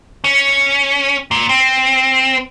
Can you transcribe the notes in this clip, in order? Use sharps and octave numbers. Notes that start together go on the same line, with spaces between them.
C#4
A#2
C4